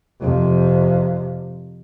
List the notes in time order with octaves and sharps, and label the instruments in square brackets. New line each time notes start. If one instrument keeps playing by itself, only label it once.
[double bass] F2 C3